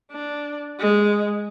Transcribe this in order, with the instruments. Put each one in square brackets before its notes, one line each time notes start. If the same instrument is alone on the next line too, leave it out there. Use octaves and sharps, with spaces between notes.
[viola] D4
G#3